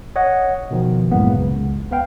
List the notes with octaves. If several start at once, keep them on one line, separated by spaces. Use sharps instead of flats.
C#5 D#5 F#5
B2 D#3 F3
C2 F#2 A2 G#3 A#3 B3
C#2
B3 B4 F5 G5